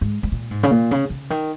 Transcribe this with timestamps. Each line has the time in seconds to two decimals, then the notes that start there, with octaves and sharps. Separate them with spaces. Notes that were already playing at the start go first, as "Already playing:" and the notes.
0.01 G#2
0.23 G#2
0.32 A#2
0.51 G#2
0.63 C#3
0.71 A#2
0.91 C#3
1.10 C#3
1.30 D#3